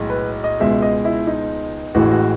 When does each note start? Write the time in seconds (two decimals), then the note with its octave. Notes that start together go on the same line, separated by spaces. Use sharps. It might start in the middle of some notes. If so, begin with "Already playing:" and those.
Already playing: B1 A2 G#3
0.10 B4
0.44 D#5
0.60 C#2 B2 G#3 E5
0.82 D#5
1.05 E4
1.27 D#4
1.95 A1 A2 E3 G#3 F#4
2.11 F#4